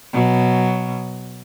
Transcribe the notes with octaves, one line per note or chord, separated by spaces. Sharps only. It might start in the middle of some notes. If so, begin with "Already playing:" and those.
B2 F#3